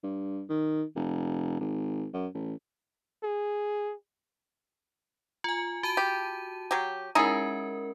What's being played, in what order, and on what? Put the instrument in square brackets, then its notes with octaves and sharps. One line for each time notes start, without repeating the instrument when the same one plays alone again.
[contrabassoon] G2
D#3
F1
G#1
F#2
A1
[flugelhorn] G#4
[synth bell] F4 G#5
F#4 A5 D#7
[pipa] G4
F#3 G4
[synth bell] G#3 C#4 A#4 [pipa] D#4 E4 G#4